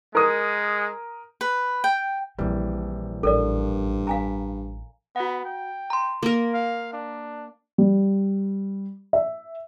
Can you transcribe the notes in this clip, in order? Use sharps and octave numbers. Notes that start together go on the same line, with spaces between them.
G#3 A#4 D#6
B4
G5
A#1 D#3 E3 G3 C4
A1 G2 A4 A#4 D5
F5 G#5 A#5
B3 F#4 F#5
G5
A#5 C6
A#3 A#4
F5
D4
G3
E5